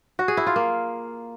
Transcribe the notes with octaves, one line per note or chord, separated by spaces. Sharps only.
F#4
G#4
E4
F4
A#3